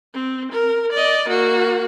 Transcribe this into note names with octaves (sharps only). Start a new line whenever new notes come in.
C4
A#4
D5 D#5
A#3 F#4